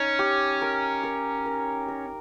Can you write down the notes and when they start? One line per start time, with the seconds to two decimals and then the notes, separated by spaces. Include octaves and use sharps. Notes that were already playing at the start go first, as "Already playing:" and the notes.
Already playing: C#4 D#4
0.19 G4
0.62 A#4
1.03 A#4
1.46 A#4
1.88 A#4